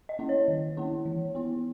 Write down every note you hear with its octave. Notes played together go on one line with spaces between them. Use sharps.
D#5
A#3 C#4 E4
C#5
D#3
A#3 C#4 E4
E3
B3 E4